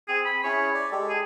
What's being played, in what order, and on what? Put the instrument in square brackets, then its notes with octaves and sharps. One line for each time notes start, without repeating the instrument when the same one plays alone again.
[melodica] C4 [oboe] G#4
[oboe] B5
[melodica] C#4 E4 G#4 [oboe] C#5
[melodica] D5
G#3 G4 A4
[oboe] G#4